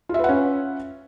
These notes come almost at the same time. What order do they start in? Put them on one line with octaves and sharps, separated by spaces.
F4 E5 B4 F#5 C#4